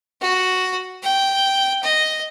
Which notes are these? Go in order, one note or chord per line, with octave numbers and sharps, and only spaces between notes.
F#4
G5
D#5